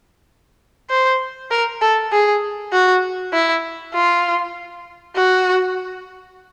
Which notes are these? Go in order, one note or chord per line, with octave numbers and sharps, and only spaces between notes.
C5
A#4
A4
G#4
F#4
E4
F4
F#4